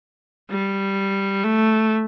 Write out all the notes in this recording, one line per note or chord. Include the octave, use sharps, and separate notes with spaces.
G3
A3